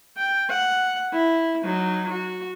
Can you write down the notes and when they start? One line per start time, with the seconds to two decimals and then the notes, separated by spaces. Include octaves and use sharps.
0.17 G5
0.50 F#5
1.13 E4
1.64 F#3 D#4
2.10 F#4